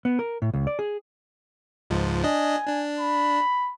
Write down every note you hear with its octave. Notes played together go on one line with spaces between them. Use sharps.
B3
A#4
A2
C#2
D5
G#4
C#2 G#2 F3
D4 D#5 G#5
D4
B5